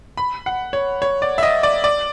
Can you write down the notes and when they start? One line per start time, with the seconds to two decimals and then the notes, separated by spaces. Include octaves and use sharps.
0.17 B5
0.46 F#5
0.73 C#5
1.02 C#5
1.22 D5
1.38 E5
1.43 D#5
1.63 D5
1.84 D5